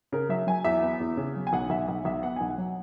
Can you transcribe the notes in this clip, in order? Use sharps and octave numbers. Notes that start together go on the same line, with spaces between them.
C#3 A#4
F#3 E5
F#3 G#5
E2 E5
B3
E2
C#3
F#3
G#5
B1 F#5
B1 E5
B1 E5
B1 E5
B3 F#5
B1 G#5
F#5
F#3